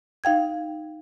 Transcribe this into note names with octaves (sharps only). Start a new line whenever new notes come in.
D#4 F5 G5 G#6